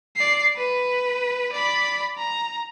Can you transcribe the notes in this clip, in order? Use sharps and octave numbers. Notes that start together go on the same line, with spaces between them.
D5 C7
B4
D5 B5
A#5